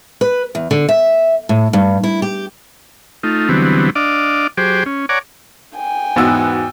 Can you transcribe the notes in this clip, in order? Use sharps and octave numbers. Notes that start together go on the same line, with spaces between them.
B4
E2
D3
E5
A2
G2
E4
G4
A3 D#4 F4
D3 E3 F#3 G3 B3 C4
D4 D5 D#5 F5 D6
F#3 G4 G#4 C5 G5 D6
C#4
C#5 D5 F#5 G#5 A#5 D6
G5 G#5
E2 G#2 B3 F#4 E6